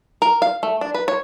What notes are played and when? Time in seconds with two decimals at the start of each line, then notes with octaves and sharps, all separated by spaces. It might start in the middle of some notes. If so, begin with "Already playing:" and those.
0.22 A#4
0.42 F5
0.63 A3
0.81 D4
0.94 B4
1.08 C#5